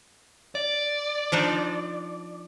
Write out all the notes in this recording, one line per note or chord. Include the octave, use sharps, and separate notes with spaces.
D5
F3 D4 D#4